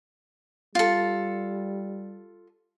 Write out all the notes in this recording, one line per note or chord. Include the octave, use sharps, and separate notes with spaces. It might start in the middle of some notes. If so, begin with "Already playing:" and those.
G3 F4 A4